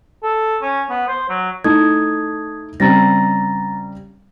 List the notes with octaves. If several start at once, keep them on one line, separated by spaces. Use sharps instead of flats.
A4
C#4
B3
C5
F#3
A3 D#4 E4 D#6 G#6
C#3 G3 C4 A#5 A6 A#6